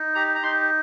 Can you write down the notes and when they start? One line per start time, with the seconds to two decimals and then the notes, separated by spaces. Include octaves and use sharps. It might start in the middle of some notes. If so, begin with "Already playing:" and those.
Already playing: D#4
0.15 G4 A#5
0.35 A#5
0.43 D#4 C6